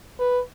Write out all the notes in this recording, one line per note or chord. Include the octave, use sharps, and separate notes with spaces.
B4